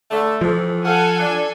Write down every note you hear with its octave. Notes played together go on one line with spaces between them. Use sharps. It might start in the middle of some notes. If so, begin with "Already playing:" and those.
D3 A3
F2 E3 F3
A4 F5 F#5 G#5
D4